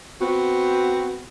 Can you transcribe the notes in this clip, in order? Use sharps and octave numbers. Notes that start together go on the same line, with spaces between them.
B3 C4 F#4